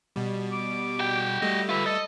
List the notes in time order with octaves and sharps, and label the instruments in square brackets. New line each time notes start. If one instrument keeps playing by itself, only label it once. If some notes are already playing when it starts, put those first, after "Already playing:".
[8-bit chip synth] B2 G3
[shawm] D6
[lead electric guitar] F#4 G5
[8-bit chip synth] G3 A3 [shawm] D#5
[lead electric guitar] F4 B4 [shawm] E5
[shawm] A4 [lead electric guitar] D#5